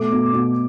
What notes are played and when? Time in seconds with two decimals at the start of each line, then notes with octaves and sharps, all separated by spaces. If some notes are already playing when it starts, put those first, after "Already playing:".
Already playing: B2 A3 D6
0.12 B2
0.33 B2